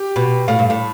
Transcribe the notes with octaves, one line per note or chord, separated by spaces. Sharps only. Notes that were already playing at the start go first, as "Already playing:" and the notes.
Already playing: G4 G5
B2
A2 F5
G2
A2